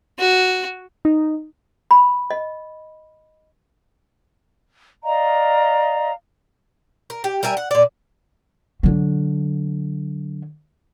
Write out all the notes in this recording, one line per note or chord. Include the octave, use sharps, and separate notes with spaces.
F#4
D#4
B5
D#5
D5 D#5 F5 A#5
A#4
G4
G3 A#4 E5 G#5
F#5
A#2 D5
D3 F#3